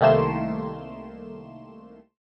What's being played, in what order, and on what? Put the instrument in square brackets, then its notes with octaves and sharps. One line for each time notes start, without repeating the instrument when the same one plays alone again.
[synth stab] C2 D#3 A3 A#3 C6 E7